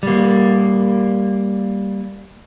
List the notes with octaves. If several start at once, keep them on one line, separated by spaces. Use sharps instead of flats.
G3 A#3